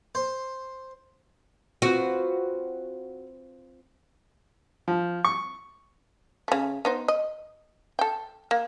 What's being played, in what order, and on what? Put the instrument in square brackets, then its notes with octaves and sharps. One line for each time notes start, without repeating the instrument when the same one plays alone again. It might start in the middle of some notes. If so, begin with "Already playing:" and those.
[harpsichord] C5
[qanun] C4 F4 B4 [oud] F#4
[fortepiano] F3
C#6
[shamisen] C#3 A3
B3 D#4 C5
D#5
A4 G5
A#3